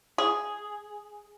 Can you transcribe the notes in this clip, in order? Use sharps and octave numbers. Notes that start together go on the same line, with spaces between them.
G#4